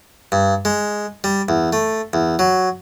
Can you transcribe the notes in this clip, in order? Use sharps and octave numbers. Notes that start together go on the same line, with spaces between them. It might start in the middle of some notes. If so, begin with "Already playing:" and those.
G2
G#3
G3
E2
A3
E2
F#3